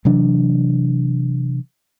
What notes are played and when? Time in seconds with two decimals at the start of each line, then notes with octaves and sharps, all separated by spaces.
0.05 C3 E3 F#3 D4